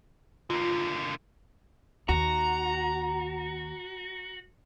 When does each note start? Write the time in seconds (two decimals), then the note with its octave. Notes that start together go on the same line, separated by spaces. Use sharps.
0.50 D3 A#3 F4
2.09 D#2 F#4 A#5